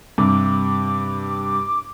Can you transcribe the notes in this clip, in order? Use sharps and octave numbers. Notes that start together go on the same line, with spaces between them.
G2 C3 D6